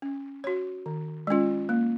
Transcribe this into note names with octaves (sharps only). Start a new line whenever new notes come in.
C#4
F#4 C#5
D#3
G#3 C#4 F4
A#3